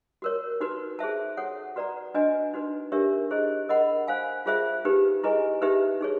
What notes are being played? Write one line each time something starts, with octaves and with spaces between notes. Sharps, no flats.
F#4 A#4 C#5
D#4 F#4 B4
G#4 C5 E5 A5
F#4 A4 C#5 F#5
F#4 B4 D5 F#5 A#5
D4 F#4 B4 D#5 G#5
D#4 F#4 B4
D4 G4 A#4 C#5 E5
E4 G#4 C5 D#5
A#4 D#5 F#5 B5
C5 F5 G#5
F4 G#4 C5 E5
D#4 G4 B4
E4 G#4 B4 D#5 G#5
D#4 G4 B4 E5
D#4 G#4 C#5